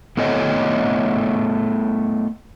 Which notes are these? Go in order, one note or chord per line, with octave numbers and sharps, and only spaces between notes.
A3 B3 E4 A4 C#5 D#5